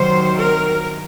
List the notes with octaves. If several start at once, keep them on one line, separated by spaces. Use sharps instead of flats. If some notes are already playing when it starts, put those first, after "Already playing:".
Already playing: C3 D#3 F#3 C5
A#4